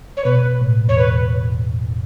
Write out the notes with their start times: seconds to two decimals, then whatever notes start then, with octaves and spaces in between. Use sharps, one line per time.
0.17 C#5
0.25 B2 B4
0.62 A2
0.88 E2 C#5
0.98 B4